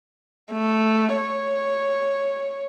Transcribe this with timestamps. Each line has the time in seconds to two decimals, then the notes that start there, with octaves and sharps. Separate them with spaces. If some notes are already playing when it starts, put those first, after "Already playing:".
0.52 A3
1.17 C#5